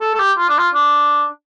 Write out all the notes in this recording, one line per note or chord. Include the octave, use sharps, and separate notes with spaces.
A4
A4
G4
F4
D4
F4
D4